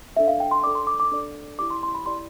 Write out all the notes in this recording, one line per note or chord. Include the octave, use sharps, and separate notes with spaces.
D4 A4 D5 E5
F5
G5
C6
D4 A4 D5 D6
C6
D6
D6
D4 A4 D5
E4 G4 D5 D6
C6
C6
B5
E4 G4 D5 C6